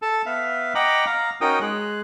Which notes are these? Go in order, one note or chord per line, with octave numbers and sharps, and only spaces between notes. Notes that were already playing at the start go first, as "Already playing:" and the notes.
A4 A5
B3 E5 F5
D#5 F#5 G5 A#5 B5 D6
F5 A#5
C#4 D#4 F#4 A#4 G5 D#6
G#3 F#6